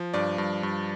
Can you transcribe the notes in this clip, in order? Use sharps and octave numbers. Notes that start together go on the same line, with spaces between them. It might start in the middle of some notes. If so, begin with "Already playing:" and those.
Already playing: F3
G2 D5
G2
G2